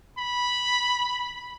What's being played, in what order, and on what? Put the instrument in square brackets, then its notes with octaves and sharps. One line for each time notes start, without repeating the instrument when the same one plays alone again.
[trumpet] B5